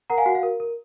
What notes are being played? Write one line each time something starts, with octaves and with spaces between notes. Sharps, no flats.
A#4 F#5 A#5
F5 G#5
F#4 F#5
F5
A#4
A#4